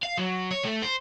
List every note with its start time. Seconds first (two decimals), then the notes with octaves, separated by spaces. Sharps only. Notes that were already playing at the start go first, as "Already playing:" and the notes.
0.03 F5
0.18 F#3
0.51 C#5
0.65 A3
0.82 C5